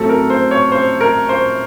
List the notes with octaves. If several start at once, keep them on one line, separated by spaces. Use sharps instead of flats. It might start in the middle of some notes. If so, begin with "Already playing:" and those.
Already playing: A2 F#3 C4 A4
A#4
C5
C#5
C5
A#4
C5